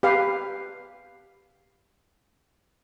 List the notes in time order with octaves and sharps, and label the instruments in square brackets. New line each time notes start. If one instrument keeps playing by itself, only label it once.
[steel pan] G4 B4 F5